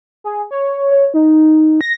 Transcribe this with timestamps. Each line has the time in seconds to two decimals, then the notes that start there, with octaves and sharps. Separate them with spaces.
0.24 G#4
0.51 C#5
0.91 C#5
1.14 D#4
1.81 A#6